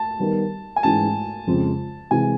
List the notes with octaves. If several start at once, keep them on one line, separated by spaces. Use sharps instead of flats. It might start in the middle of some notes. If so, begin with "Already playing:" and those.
Already playing: A5
D#3 G3 B3
G#5
G#2 E3 G#3 C#4 A5
F2 C#3 F3 G#3 C4
C3 E3 G#3 G#5